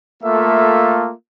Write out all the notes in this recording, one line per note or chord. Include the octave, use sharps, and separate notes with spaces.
A3 A#3 F4 A4 E5